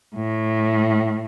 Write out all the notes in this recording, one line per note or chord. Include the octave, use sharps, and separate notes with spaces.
A2